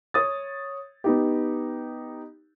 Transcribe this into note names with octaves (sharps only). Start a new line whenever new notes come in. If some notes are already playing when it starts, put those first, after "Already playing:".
C#5 D#6 A6
B3 D#4 G4